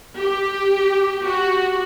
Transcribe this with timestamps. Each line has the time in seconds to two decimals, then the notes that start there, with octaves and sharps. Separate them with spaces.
0.20 G4
1.23 F#4